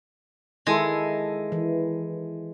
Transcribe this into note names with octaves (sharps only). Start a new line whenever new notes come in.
D#3 G#3 E4 A4
E3